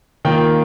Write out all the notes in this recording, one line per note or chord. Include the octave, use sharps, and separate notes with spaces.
D#3 A#3 F4 G5